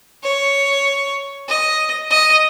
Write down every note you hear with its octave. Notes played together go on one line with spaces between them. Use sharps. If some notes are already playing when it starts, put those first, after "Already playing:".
C#5
D#5
D#5